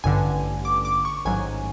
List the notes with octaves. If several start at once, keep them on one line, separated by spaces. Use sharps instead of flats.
A1 G2 D3 G#5
D6
D6
C#6
A1 G#2 D#3 F#3 G#5